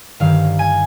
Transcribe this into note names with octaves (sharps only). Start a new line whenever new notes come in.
G1 G2 D#3 F5
G#5